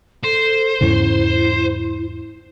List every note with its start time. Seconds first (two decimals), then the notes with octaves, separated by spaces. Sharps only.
0.24 A4 C5
0.81 E2 G#2 C#3 E4